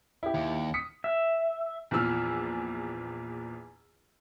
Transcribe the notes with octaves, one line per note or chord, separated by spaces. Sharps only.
E4 G4
D#2
D#6 B6 C#7
E5
A#1 E2 F3 E6 F6